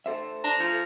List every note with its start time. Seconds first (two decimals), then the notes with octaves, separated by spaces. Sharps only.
0.06 A4 C5 E5
0.44 D4 A#5
0.60 F3